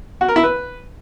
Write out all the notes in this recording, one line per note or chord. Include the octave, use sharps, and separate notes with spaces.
F#4
A#4
E4
B4